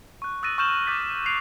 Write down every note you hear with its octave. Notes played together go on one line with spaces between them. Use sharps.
C#6 F#6
D#6 E6 F#6 A6 A#6 D#7
C#6 F6 G6 E7 F#7
D6 D#6 F6 G6 A6 B6
F#6 C7 D7 F7